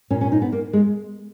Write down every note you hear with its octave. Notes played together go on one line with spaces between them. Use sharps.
A#2 C#4
C#4
D#4
B3
A#3
G#3